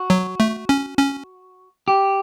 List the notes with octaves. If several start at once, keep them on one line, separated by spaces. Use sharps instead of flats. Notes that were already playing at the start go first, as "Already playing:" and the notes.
Already playing: F#4
F#3
A3
C#4
C#4
G4